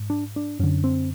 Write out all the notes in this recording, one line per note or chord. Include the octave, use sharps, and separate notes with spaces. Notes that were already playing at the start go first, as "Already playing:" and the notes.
Already playing: G#2
D4
D4
F#2 D3 C#4
C4